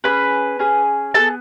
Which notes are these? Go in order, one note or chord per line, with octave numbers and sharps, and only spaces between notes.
C#4 G#4 B4 B5
C#4 G#4
B3 D4 G#4 A4 A5